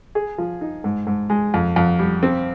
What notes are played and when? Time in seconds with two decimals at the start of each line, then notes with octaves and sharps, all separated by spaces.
0.15 G#4
0.38 F3
0.61 D#4
0.84 G#2
1.07 G#2
1.30 G#3
1.54 F2
1.76 F2
1.99 G3
2.23 C4